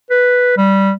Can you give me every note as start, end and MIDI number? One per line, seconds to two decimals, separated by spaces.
0.10 0.52 71
0.57 0.92 55